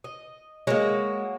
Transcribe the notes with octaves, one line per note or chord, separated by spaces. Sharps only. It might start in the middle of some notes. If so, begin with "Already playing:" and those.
D#5
G#3 A#3 F#4 C#5